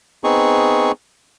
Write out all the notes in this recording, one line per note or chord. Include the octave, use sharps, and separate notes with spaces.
B3 C4 D#4 G#4 C#6